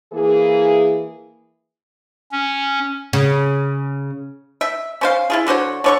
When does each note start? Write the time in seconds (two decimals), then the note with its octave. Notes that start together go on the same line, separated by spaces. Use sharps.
0.13 E3 A#3 G#4
2.32 C#4
3.13 C#3
4.61 E5
5.01 C#4 C5 F5
5.30 E4 F4 G#4
5.47 D3 F#4 C5 C#5
5.84 D3 C#5 C#6